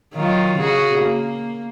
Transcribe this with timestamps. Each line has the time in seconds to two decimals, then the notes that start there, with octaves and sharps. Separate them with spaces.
0.14 D#3 F#3 F4
0.58 C#3 F#4 G#4
0.99 A#3